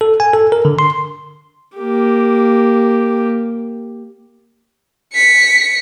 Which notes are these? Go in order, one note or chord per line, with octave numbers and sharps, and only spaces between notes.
A4
G#5
A4
A#4
D3
C6
A#3 G4
B6 C#7